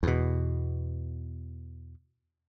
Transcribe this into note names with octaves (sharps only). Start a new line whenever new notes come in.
E2 B2